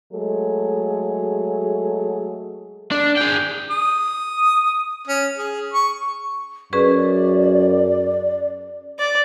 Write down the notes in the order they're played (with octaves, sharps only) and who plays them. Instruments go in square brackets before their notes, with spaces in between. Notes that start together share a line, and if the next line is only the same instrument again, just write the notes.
[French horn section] F#3 G#3 A3 G#4 A4
[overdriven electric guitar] D4
G#4 G5
[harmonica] D#6
C#4
G#4
C#6
[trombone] F#2 [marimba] C#4 G#4 B4 [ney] D5
[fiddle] D5